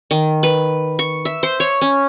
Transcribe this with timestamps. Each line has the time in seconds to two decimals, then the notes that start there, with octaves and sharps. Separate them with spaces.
0.11 D#3
0.43 B4
0.99 C#6
1.25 E5
1.43 C5
1.60 C#5
1.81 C#4